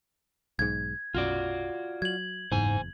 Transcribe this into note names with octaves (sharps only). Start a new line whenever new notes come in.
B1 G#2 G#6
B1 F#2 F4 F#4 D5
F#3 G#6 F#7
F#1 E2 G#2 C5 G#5